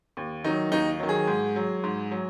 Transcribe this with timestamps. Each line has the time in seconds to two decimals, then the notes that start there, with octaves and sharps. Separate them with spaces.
0.17 D#2
0.44 D#3 F#3 D#4
0.72 D#2 D#4
1.00 D#3 F#3
1.09 G#4
1.27 G#2
1.56 F#3
1.84 G#2
2.11 F#3